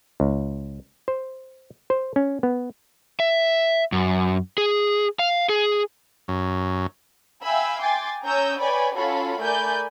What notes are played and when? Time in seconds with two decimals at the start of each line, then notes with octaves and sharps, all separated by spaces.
0.20 C#2
1.08 C5
1.90 C5
2.16 C#4
2.43 B3
3.20 E5
3.92 F#2
4.58 G#4
5.19 F5
5.49 G#4
6.28 F#2
7.43 E5 F5 G5 G#5 B5 E6
7.79 G5 G#5 C6 D6 A6
8.24 C#4 C#5 A#5 D#6 E6 G6
8.58 B4 C#5 D5 G5 G#5 B5
8.96 C#4 F4 F#4 A4 C#5 B5
9.40 A3 A#4 D5 G#5 B5 G6